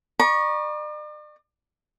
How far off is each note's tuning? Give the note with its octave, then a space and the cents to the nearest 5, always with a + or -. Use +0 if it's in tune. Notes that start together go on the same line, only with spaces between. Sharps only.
D5 +45 A#5 +40 C#6 +0